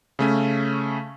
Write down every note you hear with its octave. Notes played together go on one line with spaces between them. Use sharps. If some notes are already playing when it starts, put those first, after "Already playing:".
C#3 A3 C#4